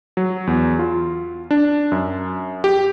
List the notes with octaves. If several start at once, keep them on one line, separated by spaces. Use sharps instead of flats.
F#3
E2
F4
D4
F#2
G4